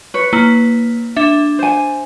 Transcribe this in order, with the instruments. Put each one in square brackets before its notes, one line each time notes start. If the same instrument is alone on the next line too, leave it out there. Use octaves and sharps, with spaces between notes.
[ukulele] B4 C#5
[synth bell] A#3 E4
D4 E5
[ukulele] C5 G#5